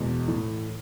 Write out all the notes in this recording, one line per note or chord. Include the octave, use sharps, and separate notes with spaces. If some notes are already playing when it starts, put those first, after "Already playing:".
Already playing: E2 B2 G#3
A2 E3 A3